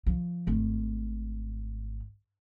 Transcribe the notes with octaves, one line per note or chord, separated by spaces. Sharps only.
F3
G#1 A3